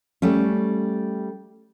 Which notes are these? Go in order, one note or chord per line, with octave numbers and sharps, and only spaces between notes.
G3 A3 C#4